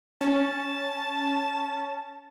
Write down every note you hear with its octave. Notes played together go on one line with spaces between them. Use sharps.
C#4 A5